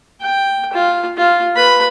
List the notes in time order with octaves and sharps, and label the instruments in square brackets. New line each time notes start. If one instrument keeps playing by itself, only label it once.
[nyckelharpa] G5
F4
F4
B4 B5